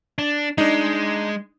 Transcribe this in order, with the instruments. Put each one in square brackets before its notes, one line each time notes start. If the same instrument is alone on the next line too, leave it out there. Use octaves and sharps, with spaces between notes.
[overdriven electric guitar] D4
[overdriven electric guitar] G#3 [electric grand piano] D4 D#4